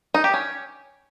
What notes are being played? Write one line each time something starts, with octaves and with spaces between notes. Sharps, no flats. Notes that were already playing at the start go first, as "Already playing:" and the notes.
D#4
G4
C#4